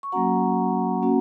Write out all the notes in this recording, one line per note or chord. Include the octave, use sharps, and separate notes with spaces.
C#6
F#3 A#3 C#4 F#4 F#5 A#5
A#3 C#4 F#4